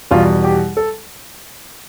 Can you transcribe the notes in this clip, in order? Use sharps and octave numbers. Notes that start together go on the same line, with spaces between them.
E2 B2 G3 F4
G4
A4